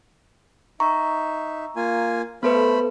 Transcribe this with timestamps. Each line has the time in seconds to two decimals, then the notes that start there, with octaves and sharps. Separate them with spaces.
0.80 D#4 E5 A#5 C#6
1.76 A#3 F4 G#5
2.43 A3 B3 A4 B4 C5 B5